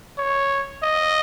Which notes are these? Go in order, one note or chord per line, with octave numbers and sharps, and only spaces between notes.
C#5
D#5